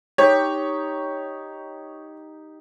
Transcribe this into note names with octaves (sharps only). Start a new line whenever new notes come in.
D#4 G4 C#5